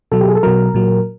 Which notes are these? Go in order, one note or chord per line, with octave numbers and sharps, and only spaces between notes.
B2 F#3 A4
G4
G#4
A4
B2 F#3 A#4
A#2 F#3